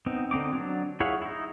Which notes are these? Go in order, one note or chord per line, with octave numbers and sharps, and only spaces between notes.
B3 C4 D#4
D3 C4 D#4 D6
F#3 D4
E4 G#4 C#5 F5 F#5
D#4 E4